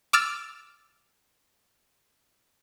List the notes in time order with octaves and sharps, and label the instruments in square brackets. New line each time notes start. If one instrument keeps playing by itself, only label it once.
[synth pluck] D6 E6 F6 A6